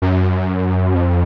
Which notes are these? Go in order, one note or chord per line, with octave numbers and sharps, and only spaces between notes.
F#2
F2